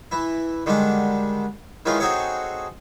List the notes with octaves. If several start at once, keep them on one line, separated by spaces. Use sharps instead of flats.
E3 E4
D3 D#3 G3 G#3 D4
D#3 E3 G#3 C#4 D#4 F4
C4 D#4 F#4 G#4 A4 C#5